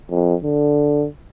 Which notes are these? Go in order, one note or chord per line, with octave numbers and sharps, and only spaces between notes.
F2
D3